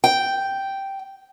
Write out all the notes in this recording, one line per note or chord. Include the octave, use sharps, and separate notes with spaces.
G5